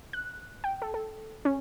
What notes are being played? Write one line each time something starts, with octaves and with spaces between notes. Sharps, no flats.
F#6
G5
A4
A4
C#4